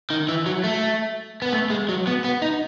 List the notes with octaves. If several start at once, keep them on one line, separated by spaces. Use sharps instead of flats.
D#3
E3
F#3
A3
B3
A3
G#3
F#3
B3
B3
D#4